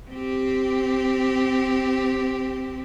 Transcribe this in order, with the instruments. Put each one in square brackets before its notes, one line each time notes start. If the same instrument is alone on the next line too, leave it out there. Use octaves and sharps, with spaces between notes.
[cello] C4 G4